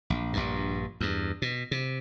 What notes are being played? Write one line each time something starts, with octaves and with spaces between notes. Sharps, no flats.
A#1
A#1 G2
E2 G2
B2
C3